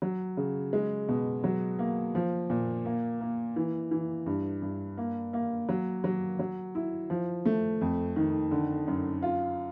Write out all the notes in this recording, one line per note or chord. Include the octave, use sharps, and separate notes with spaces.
F#3
C#3
G#3
B2
F#3
A#3
F3
A#2
A#3
A#3
E3
E3
G2
G2
A#3
A#3
F#3
F#3
F#3
E4
F3
A3
F2
D#3
D3
F#2
F4